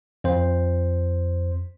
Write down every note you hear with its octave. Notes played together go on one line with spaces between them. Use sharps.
F2 C5